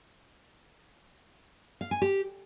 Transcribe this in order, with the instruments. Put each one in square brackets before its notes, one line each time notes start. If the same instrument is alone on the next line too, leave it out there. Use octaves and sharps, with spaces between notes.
[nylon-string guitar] F5
G#5
G4